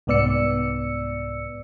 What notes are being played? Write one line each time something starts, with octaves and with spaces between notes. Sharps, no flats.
C2 G#2 B3 D5 E6 C#7